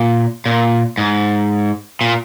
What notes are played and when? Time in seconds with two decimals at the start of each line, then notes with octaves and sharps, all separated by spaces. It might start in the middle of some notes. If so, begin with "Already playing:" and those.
Already playing: A#2
0.46 A#2
0.98 G#2
2.01 A#2